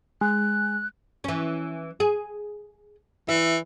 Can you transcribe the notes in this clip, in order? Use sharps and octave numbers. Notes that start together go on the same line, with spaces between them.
G#3 F#6
E3 C#4
G#4
E3 E5